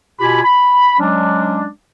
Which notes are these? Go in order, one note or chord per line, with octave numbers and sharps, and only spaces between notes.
B2 F4 G4 G#5 B5
B5
F#3 G#3 C#4 D4